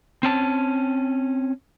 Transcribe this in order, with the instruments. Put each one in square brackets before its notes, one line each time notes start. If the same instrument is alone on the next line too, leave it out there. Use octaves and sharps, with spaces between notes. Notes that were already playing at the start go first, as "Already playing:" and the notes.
[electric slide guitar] C4 C#4 A5